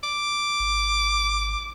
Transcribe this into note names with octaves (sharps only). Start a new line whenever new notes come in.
D6
G#1